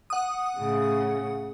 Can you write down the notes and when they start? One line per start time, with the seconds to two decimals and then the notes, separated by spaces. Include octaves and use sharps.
0.10 F#5 D#6
0.57 A2 C#3